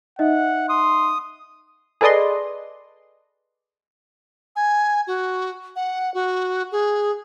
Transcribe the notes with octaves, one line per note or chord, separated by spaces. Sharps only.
D#4 D#5 E5 F#5
C6 D#6
G#4 A4 B4 D5 D#5 C6
G#5
F#4
F#5
F#4
G#4